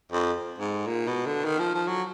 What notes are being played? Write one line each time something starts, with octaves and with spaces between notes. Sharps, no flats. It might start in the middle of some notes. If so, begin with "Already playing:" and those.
F2
G#2
A#2
B2
D3
D#3
F3
F3
F#3